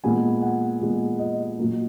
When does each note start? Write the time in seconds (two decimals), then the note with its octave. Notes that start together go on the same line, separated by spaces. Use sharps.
0.04 A#2 G#3 B3 G#5
0.42 F#5
0.81 A#2 G#3 B3
1.19 D#5
1.59 A#2 F#3 A#3